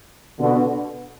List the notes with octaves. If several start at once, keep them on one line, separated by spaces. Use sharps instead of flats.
B2 D3